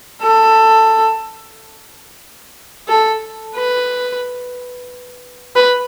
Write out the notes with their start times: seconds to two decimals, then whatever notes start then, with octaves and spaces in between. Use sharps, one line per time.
0.22 A4
2.88 A4
3.55 B4
5.56 B4